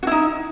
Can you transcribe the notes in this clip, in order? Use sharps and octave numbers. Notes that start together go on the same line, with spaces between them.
D#4 E4 F#4